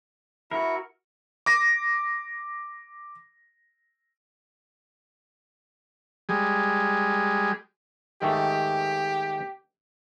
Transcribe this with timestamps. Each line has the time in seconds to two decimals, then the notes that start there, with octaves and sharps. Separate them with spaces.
0.51 E4 F#4 A#4
1.46 D6 A#6
6.29 G3 G#3
8.22 G#2 D#3 A3 G4